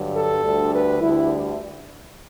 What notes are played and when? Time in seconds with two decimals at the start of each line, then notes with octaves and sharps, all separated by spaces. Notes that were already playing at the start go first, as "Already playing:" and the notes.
Already playing: G2 D3 F#3
0.15 A4
0.43 D2 D3 G3
0.72 B4
1.00 D2 D3 G3 E4